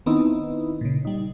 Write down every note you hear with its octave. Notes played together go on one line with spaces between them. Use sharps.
D#3 B3 C4 D#4 E4
A#2 C#3
G3 D#4